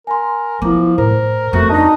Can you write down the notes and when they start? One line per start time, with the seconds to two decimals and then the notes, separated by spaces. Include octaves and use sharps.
0.07 A#4 G#5 C6
0.62 F3 B3 E4 D6
0.98 A2 A#4 C5
1.53 F2 A3 B3 F#4
1.69 D4 D#4 D#5 A5